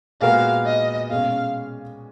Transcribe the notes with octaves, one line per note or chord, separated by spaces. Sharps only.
A#2 G#3 B3 F#4 A#4 F5
D#5
B2 G#3 C#4 F5